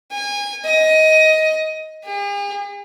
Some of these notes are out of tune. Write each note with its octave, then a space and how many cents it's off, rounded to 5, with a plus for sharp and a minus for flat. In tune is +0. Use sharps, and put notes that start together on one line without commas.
G#5 -25
D#5 +15
G#4 -45